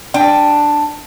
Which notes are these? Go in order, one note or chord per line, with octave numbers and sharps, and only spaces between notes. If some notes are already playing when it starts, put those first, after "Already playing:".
D4 G5